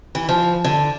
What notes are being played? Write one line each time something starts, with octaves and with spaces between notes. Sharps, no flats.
E3
F3
D3